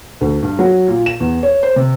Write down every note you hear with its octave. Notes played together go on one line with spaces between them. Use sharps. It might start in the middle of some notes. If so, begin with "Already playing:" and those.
D2
G2
F#3
A#2
E7
E2
C#5
C5
C3